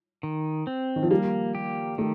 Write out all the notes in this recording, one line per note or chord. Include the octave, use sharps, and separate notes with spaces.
D#3
C4
D#3
F3
G3 A#3
G4
D#3 A3